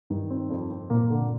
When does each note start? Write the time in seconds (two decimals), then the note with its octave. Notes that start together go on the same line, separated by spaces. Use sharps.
0.10 G2 D#3
0.30 C4
0.50 F2
0.70 C4
0.90 A#2 A#3
1.10 D3